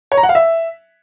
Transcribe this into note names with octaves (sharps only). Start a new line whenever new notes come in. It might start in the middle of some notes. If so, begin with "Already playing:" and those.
C#5
A#5
F#5
F5
E5